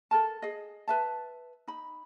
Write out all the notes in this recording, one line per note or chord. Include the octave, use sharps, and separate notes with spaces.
A4 A#4 A5
G#4 D#5
B4 E5 A5
D#4 B5